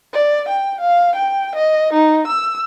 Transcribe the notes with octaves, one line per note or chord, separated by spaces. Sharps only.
D5
G5
F5
G5
D#5
D#4
E6